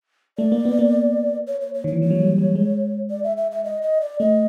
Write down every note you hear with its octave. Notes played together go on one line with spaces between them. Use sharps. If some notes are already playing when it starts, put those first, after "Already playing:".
A3 D5
A#3
B3
A#3
C#5
C#5
C#5
D#3 C#5
E3
F3 C#5
F#3
G3
G3
G#3
D5
E5
E5
E5
D#5
D#5
D5
A3 D#5